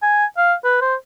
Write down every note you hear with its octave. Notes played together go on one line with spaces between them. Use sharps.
G#5
F5
B4
C5